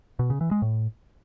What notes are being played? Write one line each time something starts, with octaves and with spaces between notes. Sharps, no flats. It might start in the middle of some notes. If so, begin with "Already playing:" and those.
B2
C#3
E3
G#3
A2